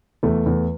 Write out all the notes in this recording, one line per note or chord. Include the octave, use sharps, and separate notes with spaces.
E2 A3
E2